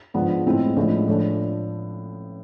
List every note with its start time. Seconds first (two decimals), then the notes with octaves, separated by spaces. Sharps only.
0.14 G#2 F3 B3 D4
0.45 A2 G#3 C4 E4
0.76 A1 A2 F3 G#3 D4
1.07 A2 F3 A3 D4